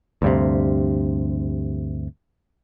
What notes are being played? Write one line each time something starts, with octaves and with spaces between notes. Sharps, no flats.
D2 G2 C3